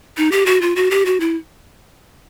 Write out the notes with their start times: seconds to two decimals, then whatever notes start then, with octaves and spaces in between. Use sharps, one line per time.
0.17 D#4
0.32 G4
0.46 F#4
0.61 F4
0.76 F#4
0.91 G4
1.06 F#4
1.20 E4